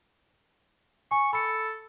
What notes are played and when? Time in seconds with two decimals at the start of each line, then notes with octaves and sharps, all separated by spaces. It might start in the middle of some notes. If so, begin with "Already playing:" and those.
1.11 G#5 C#6
1.33 A4 B5 C#7